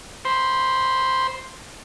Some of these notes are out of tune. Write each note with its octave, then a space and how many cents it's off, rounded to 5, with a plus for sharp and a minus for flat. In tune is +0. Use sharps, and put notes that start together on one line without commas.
C5 +0 B5 -20